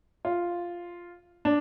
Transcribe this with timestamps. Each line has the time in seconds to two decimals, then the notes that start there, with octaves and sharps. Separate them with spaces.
0.25 F4
1.45 D4